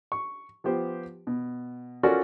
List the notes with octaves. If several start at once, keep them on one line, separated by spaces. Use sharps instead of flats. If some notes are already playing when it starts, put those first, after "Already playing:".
C#6
F3 B3 G4 C5
B2
C#4 F4 F#4 A4 A#4 D5